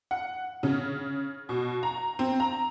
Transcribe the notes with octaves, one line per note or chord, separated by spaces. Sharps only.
F#5
C#3
B2
A#5
C4
A#5